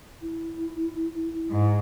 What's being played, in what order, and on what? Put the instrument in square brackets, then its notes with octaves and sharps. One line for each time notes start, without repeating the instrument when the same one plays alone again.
[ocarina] E4
[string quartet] G#2